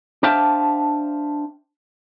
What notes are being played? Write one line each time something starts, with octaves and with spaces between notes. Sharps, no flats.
D4 C5 E5 F5 G5 A5